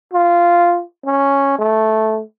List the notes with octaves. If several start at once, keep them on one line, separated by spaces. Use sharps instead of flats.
F4
C#4
A3